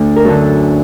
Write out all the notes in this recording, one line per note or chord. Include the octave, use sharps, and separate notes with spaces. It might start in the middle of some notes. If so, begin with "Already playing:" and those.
Already playing: D2 D3
A#4
F#2 D3 A4